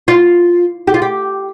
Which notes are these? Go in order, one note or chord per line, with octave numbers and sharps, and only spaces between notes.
F4
G4
F4
G4